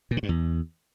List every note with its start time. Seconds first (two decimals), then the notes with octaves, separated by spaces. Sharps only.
0.11 A#2
0.17 D3
0.23 G2
0.29 E2